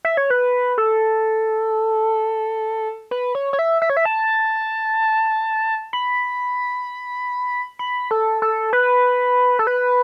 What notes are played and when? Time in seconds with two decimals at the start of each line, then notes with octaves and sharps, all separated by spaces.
0.05 E5
0.17 C#5
0.30 B4
0.78 A4
3.11 B4
3.35 C#5
3.53 C#5
3.59 E5
3.82 E5
3.90 C#5
3.97 E5
4.05 A5
5.93 B5
7.79 B5
8.11 A4
8.42 A4
8.73 B4
9.59 A4
9.67 B4